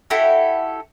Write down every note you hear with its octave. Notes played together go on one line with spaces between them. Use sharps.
E4 F#4 G4 A4